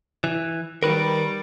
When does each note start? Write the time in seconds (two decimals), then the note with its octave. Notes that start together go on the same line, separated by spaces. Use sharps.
0.24 E3
0.83 D#3 G3 A#4 B4